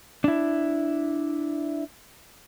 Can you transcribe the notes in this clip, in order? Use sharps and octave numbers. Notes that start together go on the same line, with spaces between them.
D4 E4